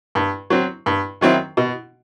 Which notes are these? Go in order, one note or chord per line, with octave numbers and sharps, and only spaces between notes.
G2
F#3 C4
G2
D#3 F#3 C4 E4
B2